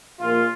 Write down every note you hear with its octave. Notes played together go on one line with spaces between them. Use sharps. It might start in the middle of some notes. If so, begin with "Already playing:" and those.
A#1 A#2 A#3 F4